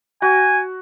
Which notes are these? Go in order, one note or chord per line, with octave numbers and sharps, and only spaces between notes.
F#4 G#5